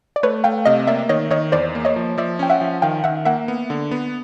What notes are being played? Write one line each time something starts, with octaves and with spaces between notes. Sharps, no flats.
D5
A3 B4 C#5
A3 F5 G5
C3 D#5 F5
A#3 D5 E5
D#3 C#5 D#5
D#3 C#5 D#5
E2 C5 D5
A#3
C#5 D#5
F3
F3 D5 E5
C#4 G5
E5 F#5
F3
D#3 F5 G5
D#3 E5 F#5
A#3 E5 F#5
B3
D3
B3